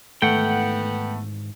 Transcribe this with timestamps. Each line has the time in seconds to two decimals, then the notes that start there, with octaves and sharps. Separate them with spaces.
0.22 G#2 D#3 E3 A3 B3 F#5 G5